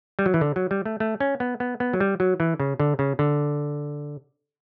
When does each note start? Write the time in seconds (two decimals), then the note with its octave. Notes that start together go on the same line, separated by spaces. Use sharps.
0.19 G3
0.26 F#3
0.34 E3
0.41 D3
0.56 F#3
0.71 G3
0.85 A3
1.00 A3
1.20 C#4
1.40 B3
1.60 B3
1.80 B3
1.93 F#3
2.00 G3
2.20 F#3
2.40 E3
2.60 C#3
2.80 D3
2.99 C#3
3.19 D3